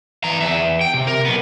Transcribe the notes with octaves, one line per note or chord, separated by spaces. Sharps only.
E3 A#5
E2 E5
G5
C3
A#4
B1 B3